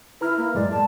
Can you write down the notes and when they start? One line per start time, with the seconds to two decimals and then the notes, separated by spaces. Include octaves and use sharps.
0.21 E4 B4 A#5 F6
0.38 A#3
0.55 F#2 A2 G#3 D5
0.71 A5